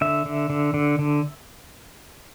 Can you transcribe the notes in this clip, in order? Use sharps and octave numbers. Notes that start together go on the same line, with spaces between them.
D3 E5
D3
D3
D3
D3